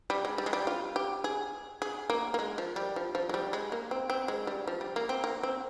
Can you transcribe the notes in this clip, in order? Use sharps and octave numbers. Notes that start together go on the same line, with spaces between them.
G3
G#3
G3
G#3
G3
F4
G4
G#4
G#4
A#3
A#3
G#3
F3
G3
F3
F3
G#3
G3
G#3
A#3
C4
C4
G#3
G3
F3
G3
A#3
C4
A#3
C4